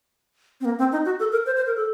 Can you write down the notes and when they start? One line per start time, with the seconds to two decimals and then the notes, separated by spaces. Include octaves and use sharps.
0.61 C4
0.65 A#3
0.79 C4
0.92 D#4
1.05 F#4
1.19 A4
1.32 A#4
1.46 C5
1.56 C5
1.66 A#4
1.76 A4